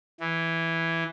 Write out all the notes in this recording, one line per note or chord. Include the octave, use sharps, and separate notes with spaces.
E3